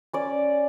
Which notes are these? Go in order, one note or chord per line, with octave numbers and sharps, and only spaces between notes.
C#4 D5